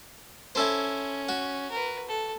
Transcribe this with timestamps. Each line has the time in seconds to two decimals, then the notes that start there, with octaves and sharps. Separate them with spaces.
0.55 C#4 E4 A4 C5
1.29 F#4
1.71 A#4 B4
2.08 A4